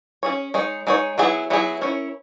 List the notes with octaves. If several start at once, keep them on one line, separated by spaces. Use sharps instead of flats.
C#4 G#4 C#5
G#3 D#4 G#4 C#5
G#3 D#4 G#4 C#5
F#3 B3 E4 G#4
F#3 B3 E4 G#4
C#4 E4 A#4 C#5